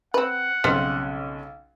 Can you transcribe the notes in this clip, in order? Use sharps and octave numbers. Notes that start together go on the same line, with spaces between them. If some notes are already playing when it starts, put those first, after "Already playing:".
C4 B4 F#5
B1 C#3 G3 C4